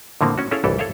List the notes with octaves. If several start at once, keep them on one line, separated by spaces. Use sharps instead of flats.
A2 D3 F3 A#3 C4
C#4 F#4
C#4 E4 G#4 A4 C#5 F5
G1 C2 E3 G4 A4
A4 C#5 E5 F5 G5